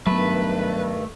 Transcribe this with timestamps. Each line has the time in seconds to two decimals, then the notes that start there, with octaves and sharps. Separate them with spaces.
0.07 G2 D#3 F#3 A3 B3 B4